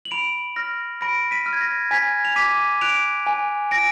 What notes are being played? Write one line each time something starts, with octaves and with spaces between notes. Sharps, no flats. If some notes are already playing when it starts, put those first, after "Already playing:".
F#7
B5 D7 F7
F6 A#6
B5 A#6 D7
B6 D#7
F6
G#6
A#6
G#5 G#6 B6
F7
D6 B6 D#7
F#6 D7 F7
G#5
G#5 A#6 D7